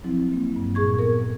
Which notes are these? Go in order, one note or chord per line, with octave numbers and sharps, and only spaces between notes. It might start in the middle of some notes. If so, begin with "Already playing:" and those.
F3 F#3 C4 E4
A#3
G2
A#2 G#4 C#6 G#6
B3 A4 A#4